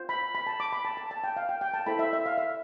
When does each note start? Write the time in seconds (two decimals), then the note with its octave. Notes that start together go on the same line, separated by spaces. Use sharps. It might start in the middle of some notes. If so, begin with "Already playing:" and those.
Already playing: F4 C5
0.09 B5
0.35 B5
0.47 A5
0.60 D6
0.73 B5
0.85 A5
0.97 A5
1.11 A5
1.24 G5
1.36 F5
1.49 G5
1.61 G5
1.74 A5
1.86 E4 A4 C5 B5
1.99 E5
2.13 E5
2.26 F5
2.38 E5